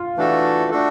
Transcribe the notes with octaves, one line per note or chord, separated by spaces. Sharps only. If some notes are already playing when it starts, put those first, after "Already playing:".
Already playing: F4
E3 A3 D4 F#4 A4
A3 D4 F#4 A4